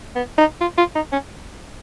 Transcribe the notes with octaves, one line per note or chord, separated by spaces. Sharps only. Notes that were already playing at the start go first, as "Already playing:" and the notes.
B3
D#4
F4
F4
D#4
C#4